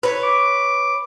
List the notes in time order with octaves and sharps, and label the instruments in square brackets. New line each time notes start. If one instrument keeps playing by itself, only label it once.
[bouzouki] B4 C#5
[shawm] D6